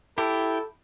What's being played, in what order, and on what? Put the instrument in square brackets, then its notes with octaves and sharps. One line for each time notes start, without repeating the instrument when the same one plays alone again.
[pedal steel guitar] E4 G4 [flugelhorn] A4